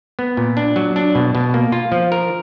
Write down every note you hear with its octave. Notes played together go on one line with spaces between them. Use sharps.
B3
A#2
D4
F#3
D4
B2
B2
A#3
F4
F3
A#4